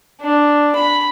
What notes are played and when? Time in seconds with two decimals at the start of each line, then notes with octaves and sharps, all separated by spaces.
0.21 D4
0.75 B5